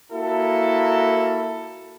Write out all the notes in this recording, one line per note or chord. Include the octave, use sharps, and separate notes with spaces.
A#3 E4 F#4 A4